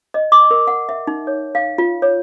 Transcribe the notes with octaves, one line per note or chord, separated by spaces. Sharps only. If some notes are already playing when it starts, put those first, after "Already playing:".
D#5
D6
A#4
F#5
E5
D#4
C#5
F5
F4
C#5